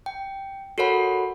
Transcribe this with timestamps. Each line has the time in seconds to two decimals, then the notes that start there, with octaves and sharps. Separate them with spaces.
0.06 G5
0.78 F#4 A4 A#4 C#5 F#5 B5